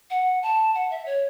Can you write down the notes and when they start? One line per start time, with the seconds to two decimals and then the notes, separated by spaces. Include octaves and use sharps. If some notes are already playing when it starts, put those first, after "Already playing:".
0.10 F#5
0.43 A5
0.75 F#5
0.90 E5
1.06 C#5